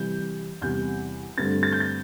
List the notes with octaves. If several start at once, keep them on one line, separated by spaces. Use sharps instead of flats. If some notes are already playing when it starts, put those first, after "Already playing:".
Already playing: C3 E3 G3 G6
E2 C3 G3 G6
G2 D3 A3 C4 A6
A6
G6
A6